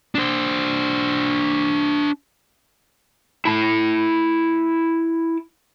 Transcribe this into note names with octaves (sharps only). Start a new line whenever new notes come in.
D4 C5
E4 A5